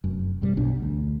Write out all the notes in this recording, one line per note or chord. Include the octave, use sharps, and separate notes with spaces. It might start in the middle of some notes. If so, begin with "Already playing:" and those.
F1 F#2
A1 F#2 C3 G3
B1 B2 D4
D2